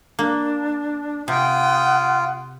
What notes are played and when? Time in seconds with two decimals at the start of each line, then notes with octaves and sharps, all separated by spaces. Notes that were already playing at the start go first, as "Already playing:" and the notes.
0.19 A#3 D4
1.28 C3 F4 F#5 G5 D#6